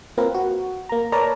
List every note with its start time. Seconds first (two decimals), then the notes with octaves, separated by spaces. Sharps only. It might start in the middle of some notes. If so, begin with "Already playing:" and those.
0.17 A#3 C4 F4 A#4 B4
0.34 F#4
0.89 A#3 A#5
1.12 A#4 B4 C#5 D5 A5 A#5